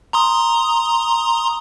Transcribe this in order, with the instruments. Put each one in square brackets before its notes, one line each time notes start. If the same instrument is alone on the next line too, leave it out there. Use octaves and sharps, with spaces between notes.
[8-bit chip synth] A#5 C6 D#6